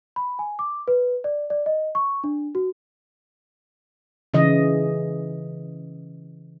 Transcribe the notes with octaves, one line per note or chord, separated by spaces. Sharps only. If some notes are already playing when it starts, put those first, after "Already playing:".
B5
G#5
D6
B4
D5
D5
D#5
C#6
D4
F#4
C#3 E3 D#5